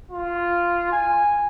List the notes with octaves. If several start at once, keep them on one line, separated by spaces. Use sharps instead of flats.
F4
G#5